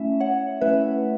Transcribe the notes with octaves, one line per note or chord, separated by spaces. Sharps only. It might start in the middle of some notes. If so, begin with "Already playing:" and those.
Already playing: A3 C#4 E4 E5
C#5 F#5
A3 C#4 E4 B4 E5